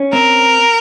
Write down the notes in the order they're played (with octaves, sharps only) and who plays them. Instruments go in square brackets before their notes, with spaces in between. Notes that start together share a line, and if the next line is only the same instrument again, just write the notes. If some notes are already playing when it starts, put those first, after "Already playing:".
Already playing: [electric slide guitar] C#4
[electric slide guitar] C4 [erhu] A#4